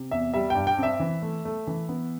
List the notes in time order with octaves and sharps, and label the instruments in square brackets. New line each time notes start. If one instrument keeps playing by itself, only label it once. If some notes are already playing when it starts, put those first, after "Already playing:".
Already playing: [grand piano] C3
E2 E5
G3 E5
G2 G5
G5
C4 E5
E3
A3
A3
E3
B3